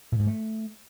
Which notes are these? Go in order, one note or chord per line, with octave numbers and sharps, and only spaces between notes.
A#2
G#2
A3